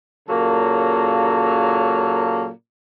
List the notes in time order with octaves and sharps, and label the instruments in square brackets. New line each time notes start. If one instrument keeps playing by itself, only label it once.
[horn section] A#2 C#3 F#3 A#3 A4